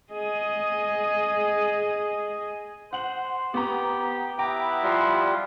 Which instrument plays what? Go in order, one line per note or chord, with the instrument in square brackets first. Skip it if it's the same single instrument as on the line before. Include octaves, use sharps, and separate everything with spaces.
[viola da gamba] G#4 D#5
[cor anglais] C5 [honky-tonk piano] F#5 F#7
[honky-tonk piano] B3 A#5 [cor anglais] G4
[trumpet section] B3 E4 [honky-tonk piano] G5 [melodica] A#5 D6
[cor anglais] F3 [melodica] G3 F4